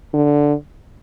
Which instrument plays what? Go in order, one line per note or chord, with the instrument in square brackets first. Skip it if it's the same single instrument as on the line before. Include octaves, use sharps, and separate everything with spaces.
[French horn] D3